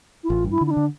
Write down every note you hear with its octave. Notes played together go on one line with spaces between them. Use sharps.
E4
A1 F4
G2
E4
D3
E4
D4
D3